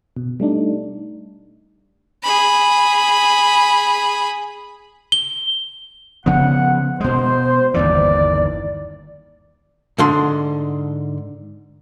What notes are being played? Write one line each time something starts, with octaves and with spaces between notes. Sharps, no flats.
B2
G3 A3 D4 D#4
G#4 B5
G7
C#3 F3 B3 F#5
B2 G#3 C5
G1 D#2 E3 D5
G#2 D3 C6